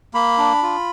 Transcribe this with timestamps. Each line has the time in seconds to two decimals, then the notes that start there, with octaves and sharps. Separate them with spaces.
0.14 A#3 B5
0.38 D4
0.62 F4